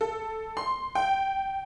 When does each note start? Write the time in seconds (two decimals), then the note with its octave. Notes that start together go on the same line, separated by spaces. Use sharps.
0.01 A4
0.57 C6
0.95 G5